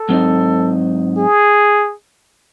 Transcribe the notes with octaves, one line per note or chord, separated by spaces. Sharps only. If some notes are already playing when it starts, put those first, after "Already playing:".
Already playing: A4
G#2 F#3 C4 D#4
G#4